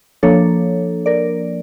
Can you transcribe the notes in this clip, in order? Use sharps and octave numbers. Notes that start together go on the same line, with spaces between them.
F3 A#3 D4 A4 C#5
A#4 D5